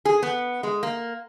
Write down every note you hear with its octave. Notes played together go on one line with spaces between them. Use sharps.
G#4
B3
G#3
A#3